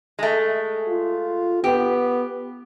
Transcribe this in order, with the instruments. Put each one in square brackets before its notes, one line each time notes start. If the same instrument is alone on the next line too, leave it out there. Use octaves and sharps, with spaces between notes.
[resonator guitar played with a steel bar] G#3 A3
[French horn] F4
[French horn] B3 [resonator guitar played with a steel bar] G4